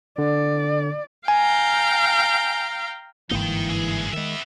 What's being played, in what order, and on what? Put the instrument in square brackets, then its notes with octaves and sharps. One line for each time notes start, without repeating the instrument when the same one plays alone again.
[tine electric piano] D3 [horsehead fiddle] D5
[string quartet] F5 G5 A#5 [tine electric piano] G#5
[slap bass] G1 G#2 A#3 [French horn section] E3 [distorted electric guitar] D#4 G5
[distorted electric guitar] D3 G#4
[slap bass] D#3 G#3 [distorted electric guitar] B3 E5